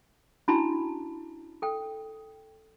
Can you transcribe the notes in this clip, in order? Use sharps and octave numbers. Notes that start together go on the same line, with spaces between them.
C#4 D4 E4 F#4 A5 B5
A4 G5